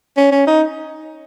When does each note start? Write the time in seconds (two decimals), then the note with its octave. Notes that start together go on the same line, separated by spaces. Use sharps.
0.17 C#4
0.32 C#4
0.47 D#4